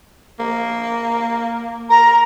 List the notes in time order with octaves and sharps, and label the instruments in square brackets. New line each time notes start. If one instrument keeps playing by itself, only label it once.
[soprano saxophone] A#3
[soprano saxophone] A#4 [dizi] A#5